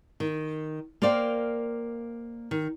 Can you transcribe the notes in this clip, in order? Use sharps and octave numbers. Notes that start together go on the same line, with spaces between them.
D#3
A#3 A#4 C5 D5 F5 G5
D#3